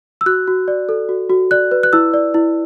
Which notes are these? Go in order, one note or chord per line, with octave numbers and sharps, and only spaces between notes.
E6
F#4 F#6
F#4
D5
A4
F#4
F#4
D5 F#6
B4
F#6
E4 E6
D5
E4